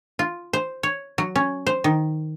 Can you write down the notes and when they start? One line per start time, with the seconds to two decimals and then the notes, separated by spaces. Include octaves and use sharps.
0.19 F4
0.53 C5
0.83 C#5
1.18 F#3
1.36 C#4
1.67 C5
1.84 D#3